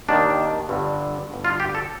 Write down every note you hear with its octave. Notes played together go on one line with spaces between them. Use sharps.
D#2 D#3 D4
G1 G2 D3
G1 G2 D3
F4
G4
A4